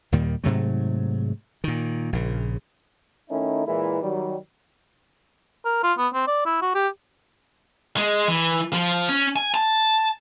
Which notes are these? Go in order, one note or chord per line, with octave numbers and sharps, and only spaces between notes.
D#2 A#2 D#3 G3
G#2 C3 F#3 A3
A#2 D#3
A#1 C#3
D#3 A3 C#4 D#4 E4
A#2 E3 G#3 E4 A#4 B4
D#3 F#3 G3
A#4
F4
B3
C4
D5
E4
F#4
G4
G#3
E3
F3
C#4
G#5
A5